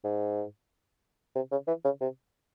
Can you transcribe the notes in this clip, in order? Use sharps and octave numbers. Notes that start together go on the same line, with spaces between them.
G#2
C3
C#3
E3
C#3
C3